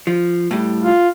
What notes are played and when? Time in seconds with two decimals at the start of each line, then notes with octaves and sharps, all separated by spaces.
0.07 F3
0.51 A2 G3
0.84 F4